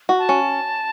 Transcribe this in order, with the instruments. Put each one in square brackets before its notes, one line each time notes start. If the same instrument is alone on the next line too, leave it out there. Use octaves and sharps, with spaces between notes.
[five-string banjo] F#4
[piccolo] A5
[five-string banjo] C#4